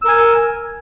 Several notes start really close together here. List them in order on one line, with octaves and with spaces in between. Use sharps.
E6 A#4 G#5